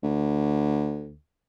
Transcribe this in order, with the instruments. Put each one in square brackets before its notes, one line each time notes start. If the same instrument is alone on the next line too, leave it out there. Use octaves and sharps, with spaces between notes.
[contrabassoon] D2